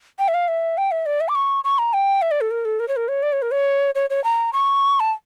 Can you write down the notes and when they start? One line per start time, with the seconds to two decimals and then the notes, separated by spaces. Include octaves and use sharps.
0.19 G5
0.28 E5
0.34 F5
0.48 E5
0.77 G5
0.91 E5
1.06 D5
1.20 E5
1.28 D6
1.35 C#6
1.64 C#6
1.78 A#5
1.93 G5
2.22 E5
2.31 D5
2.41 A4
2.51 A#4
2.65 A4
2.80 A#4
2.88 C#5
2.96 A#4
3.08 C#5
3.23 D5
3.32 C#5
3.42 A#4
3.51 C#5
3.95 C#5
4.10 C#5
4.24 A#5
4.53 C#6
5.00 A5